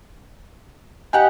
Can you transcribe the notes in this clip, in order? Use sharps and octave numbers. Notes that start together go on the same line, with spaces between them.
D#4 G4 F#5 G#5